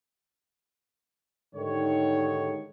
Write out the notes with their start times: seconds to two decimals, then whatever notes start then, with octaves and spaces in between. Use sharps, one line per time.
1.55 G#2 D3 D#3 G3 C#5